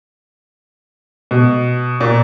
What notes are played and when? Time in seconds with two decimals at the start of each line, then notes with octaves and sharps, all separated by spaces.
1.31 B2
2.01 A#2